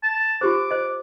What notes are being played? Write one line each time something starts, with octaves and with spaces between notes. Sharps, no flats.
A5
F4 G4 C5 D6
C5 D#5